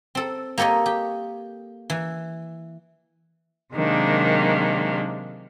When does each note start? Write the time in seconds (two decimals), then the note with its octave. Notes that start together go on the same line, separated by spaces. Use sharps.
0.15 C4 A4
0.58 A#3 G4 A4 C#5 D#5
0.86 G4
1.90 E3
3.74 C3 D#3 F#3 G#3 A#3 D4